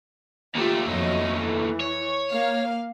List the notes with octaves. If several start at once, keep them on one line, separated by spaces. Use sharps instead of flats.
D#2 A3 F4 G4
F2 F#3 D#5
E3
C#5
A#3 F5